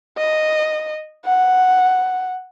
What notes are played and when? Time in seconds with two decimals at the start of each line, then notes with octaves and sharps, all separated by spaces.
0.17 D#5
1.25 F#5